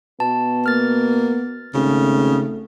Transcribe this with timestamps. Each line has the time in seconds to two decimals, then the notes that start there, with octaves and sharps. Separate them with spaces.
0.20 B2 B3 A5
0.66 A#3 F6 A6
1.75 G#1 C#3 A3